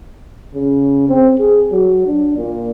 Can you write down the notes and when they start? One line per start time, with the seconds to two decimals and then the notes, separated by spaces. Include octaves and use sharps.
0.55 C#3
1.09 C4
1.39 G#4
1.72 F#3
2.06 D4
2.37 A#2